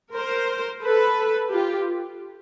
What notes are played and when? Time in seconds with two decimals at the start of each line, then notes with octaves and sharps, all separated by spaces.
0.14 A#4 C5
0.83 A4 B4
1.51 F4 G4